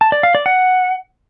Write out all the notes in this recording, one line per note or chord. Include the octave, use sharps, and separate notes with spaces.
A5
D5
F5
D5
F#5